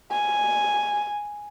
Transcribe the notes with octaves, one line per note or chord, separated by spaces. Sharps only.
G#5